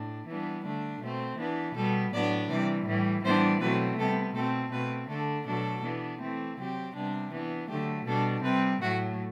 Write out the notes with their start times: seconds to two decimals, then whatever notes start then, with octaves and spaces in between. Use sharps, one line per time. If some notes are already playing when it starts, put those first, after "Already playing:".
Already playing: A2 D4
0.28 E3 G3 B3 D4
0.64 D3 A3 D4
1.02 B2 A3 C4
1.39 E3 B3 D4
1.75 B2 G3 B3 A4
2.13 A2 F#3 B3 D4 D5
2.51 C3 E3 G3 D5
2.87 A2 E3 G3
3.24 A2 E3 G3 B3 D4 C5
3.61 B2 F#3 A3 C4 B4
3.99 C3 G3 B3 A4
4.35 B2 A3 C4 A4
4.72 B2 A3 C4 B4
5.09 D3 A3 D4 A4
5.46 B2 F#3 A3 D4 A4
5.83 E3 B3 D4
6.21 E3 A3 C4
6.59 C3 F#3 C4 G4
6.95 C3 G3 B3 D4
7.32 E3 B3 D4
7.70 D3 F#3 A3 G4
8.07 B2 G3 D4 A4
8.43 C3 G3 C4 B4
8.81 A2 F#3 A3 F#4